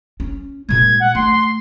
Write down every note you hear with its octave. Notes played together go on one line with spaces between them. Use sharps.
C#4
A#2 G#3 G#6
F#5
A3 C6